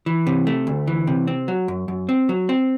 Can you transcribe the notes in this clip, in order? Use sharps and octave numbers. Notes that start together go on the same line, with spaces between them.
E3
C3
A3
D2
E3
C3
C4
F#3
F#2
F#2
C4
F#3
C4